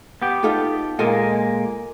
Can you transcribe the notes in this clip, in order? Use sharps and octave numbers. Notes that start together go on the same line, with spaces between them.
B3 G4
D#4 F4 A4
A#2 G#3 A#3 A4 A#4 G#5